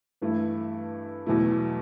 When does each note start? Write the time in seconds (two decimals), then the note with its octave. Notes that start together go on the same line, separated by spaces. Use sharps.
0.22 G2 E3 A3 E4
1.26 E2 B2 F#3 A3 E4